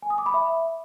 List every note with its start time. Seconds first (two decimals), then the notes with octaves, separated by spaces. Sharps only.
0.02 G#5
0.10 D#6
0.18 D6
0.26 B5
0.34 E5